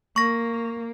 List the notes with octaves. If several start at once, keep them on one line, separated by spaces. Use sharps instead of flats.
A#3 C#6 A#6